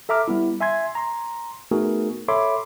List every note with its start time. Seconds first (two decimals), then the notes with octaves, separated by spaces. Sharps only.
0.09 A4 E5 A#5 D6 F6
0.28 G3 B3 E4
0.60 E5 G#5 C6 G#6
0.95 A#5 C6
1.71 A3 B3 D#4 F#4 G#4 A#4
2.28 A4 C#5 E5 B5 C6 D6